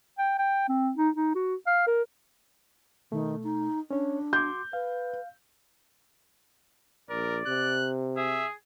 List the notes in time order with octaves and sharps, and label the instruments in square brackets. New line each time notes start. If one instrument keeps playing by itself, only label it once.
[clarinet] G5
G5
C4
D#4
D#4
F#4
F5
A#4
[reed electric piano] B2 A3 [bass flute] D#3
[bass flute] D#4
[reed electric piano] C#4 C#5 [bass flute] D4
[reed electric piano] F#4 C6 D6 [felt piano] G6
[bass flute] B4 [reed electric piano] F5
[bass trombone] A#1 [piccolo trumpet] A#4 [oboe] D5
[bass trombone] C3 [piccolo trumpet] F#6
[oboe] G#4 [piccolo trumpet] E5